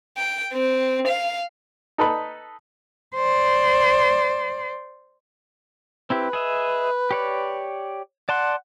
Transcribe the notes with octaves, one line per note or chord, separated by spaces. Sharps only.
G5
C4
F5
D#4 A4 B4 B5
C5 D5
C4 E4 G4 B4
G#4 D#5 E5
G4 C#5 D5
D5 F#5 A5 C6